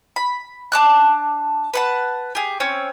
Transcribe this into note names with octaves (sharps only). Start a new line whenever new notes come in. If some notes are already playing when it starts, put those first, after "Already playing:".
B5
D4 A5 D6 F#6
B4 F#5 A5
G4 G#4
C4 C#4 C#5